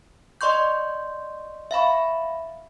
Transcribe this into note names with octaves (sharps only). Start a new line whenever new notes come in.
D5 D#5 C6 C#6 G6
E5 F5 B5 C#6